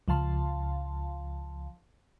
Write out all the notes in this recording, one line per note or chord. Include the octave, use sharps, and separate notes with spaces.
C#2 F3 F5 A5 C6